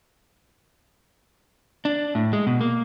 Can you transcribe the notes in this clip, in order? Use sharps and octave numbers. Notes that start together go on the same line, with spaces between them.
D4
A2
G#3
B2
A#3